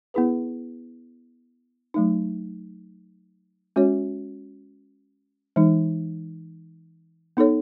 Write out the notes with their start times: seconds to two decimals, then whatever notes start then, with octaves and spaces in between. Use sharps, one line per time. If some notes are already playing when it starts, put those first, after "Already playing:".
0.14 B3 E4 G#4 B4
1.94 F#3 A3 D#4
3.76 G#3 C#4 F#4 C#5
5.56 E3 G#3 D#4
7.37 B3 D#4 A4 C#5